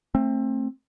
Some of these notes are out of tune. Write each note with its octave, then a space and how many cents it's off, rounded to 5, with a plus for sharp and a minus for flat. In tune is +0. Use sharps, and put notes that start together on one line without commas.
A3 +15 C4 +25